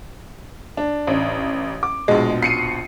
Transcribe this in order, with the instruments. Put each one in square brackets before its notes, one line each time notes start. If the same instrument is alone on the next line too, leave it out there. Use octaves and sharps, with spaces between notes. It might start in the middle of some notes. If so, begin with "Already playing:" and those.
[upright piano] D4
[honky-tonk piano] A1
[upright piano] D6
[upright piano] A#1 B2 [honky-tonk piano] G#3
[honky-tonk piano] C7 C#7 D#7